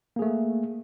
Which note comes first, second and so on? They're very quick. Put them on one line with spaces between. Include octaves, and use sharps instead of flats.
A#3 G#4 A3